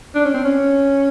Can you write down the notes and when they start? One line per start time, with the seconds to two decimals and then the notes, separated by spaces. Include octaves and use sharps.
0.15 D4
0.25 C#4
0.34 C4
0.44 C#4